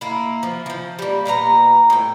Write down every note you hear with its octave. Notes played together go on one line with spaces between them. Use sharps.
A#3 E4
F3
E3 F3
G3 A#3
A#2 B3 F4 A#5
A2 G5